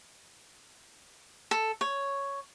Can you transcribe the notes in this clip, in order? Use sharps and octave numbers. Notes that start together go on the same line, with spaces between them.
A4
C#5